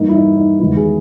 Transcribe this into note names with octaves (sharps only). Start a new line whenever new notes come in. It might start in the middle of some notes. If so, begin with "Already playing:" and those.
Already playing: G2 E3 A#3 D#4
E4
D#4
D#4
E2 D#3 G#3 B3 E4
G#4